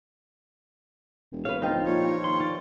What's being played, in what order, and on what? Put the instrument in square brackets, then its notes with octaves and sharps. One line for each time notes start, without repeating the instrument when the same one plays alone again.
[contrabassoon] E1
[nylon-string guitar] B4 C#5 [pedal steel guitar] F5
[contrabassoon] D1 [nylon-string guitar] F3 D#5 G5 [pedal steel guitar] D#4 F4
[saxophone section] G2 C#5 [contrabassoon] A#2
[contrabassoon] D#3 [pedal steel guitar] C6
[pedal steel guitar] F4 D5